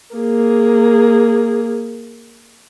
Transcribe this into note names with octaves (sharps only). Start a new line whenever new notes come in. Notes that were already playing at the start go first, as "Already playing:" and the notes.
A#3 G#4